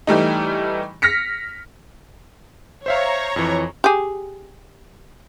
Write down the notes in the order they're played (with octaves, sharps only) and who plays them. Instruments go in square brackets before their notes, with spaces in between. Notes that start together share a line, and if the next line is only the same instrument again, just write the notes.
[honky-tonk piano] E3 G3 A3 D#4
F6 A#6 B6 C#7
[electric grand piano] C5 E5 F5 [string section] C#5 A#5
[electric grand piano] F2 E3
[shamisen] G4 G#4